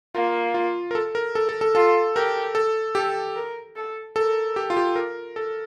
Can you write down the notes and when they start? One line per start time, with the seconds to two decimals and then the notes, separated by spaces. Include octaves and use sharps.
0.15 A#3 F4
0.54 F4
0.91 A#4
0.95 A4
1.15 A#4
1.35 A4
1.49 A4
1.61 A4
1.75 F4 A4
2.15 G4 A#4
2.55 A4
2.95 G4 A4
3.36 A#4
3.76 A4
4.16 A4 A#4
4.56 G4
4.70 F4
4.77 G4
4.96 A#4
5.36 A4